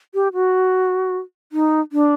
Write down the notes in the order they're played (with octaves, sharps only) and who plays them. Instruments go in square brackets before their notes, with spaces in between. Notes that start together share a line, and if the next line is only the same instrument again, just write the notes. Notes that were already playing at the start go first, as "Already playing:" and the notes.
[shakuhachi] G4
F#4
D#4
D4